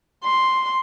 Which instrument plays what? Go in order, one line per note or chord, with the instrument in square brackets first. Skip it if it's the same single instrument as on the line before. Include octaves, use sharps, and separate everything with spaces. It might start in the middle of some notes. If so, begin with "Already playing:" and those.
[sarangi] C6